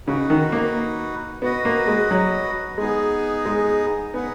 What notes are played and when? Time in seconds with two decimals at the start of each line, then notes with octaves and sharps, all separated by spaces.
0.07 C#3 D#4 F#4 B4
0.30 D#3
0.52 A#3
1.42 B3 F#4 B4 D#5
1.65 A#3
1.87 G#3
2.11 F#3
2.77 G#3 B3 D#4 G#4
3.46 G#3
4.14 B3 D#4 G#4 B4 F#5